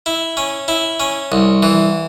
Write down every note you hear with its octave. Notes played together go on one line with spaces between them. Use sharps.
E4
C#4
E4
C#4
C2
E3